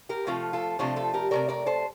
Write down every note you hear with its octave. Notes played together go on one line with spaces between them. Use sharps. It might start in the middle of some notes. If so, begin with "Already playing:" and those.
G4 A#4
C3 F3 A3 F4 A4
F4 A4
C3 F3 A3 D4 F4
F4 A4
G4 A#4
C3 F3 A3 A#4 D5
A#4 D5
A4 C5